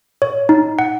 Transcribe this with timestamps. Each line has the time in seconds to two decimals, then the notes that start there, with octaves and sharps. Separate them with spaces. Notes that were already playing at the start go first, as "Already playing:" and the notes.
0.22 C#5
0.49 D#4
0.79 F#5